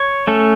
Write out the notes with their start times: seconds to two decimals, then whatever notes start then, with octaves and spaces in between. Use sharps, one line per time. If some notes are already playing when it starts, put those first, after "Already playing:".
Already playing: C#5
0.27 A3 C#4 A4